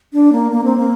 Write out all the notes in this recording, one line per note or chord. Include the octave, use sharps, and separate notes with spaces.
D4
A#3
A#3
C4
A#3